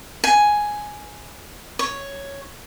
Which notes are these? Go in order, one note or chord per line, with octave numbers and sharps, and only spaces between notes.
G#5
C#5